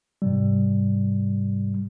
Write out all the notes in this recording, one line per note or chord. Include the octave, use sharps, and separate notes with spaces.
G#2 C3 G3